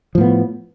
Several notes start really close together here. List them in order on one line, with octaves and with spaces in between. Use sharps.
F3 A2 B3